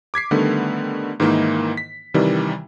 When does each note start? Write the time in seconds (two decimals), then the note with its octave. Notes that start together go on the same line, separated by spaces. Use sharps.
0.14 D6 G#6 B6 C7
0.31 D3 D#3 G3 A3 B3
1.20 G#2 D#3 E3 A#3 D#4 E4
1.77 B6
2.14 C3 D#3 E3 G3